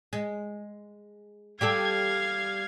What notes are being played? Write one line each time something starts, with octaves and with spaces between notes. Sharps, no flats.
G#3
G3 G4 A4 F5 G#6